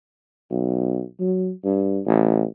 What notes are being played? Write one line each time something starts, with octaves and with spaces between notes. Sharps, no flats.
B1
F#3
G2
A1